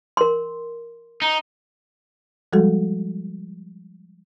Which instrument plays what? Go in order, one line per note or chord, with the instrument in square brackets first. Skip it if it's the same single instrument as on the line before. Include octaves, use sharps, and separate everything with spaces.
[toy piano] A#4 C6
[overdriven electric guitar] D#4
[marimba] F3 G3 G#3 F#4 A4